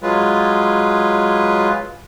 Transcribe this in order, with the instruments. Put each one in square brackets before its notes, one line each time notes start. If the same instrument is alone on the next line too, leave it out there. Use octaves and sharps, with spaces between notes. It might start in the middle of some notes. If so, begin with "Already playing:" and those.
[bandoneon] F#3 G#3 F4 B4